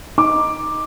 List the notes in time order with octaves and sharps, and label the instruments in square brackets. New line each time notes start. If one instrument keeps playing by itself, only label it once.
[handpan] D#4 [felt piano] D6